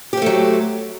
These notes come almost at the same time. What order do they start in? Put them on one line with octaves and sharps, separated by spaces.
G4 C4 A3 F#3